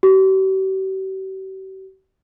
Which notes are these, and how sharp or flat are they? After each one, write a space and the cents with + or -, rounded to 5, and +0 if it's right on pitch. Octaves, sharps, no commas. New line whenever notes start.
G4 -45